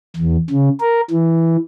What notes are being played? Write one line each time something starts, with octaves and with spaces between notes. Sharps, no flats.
E2
C#3
A#4
E3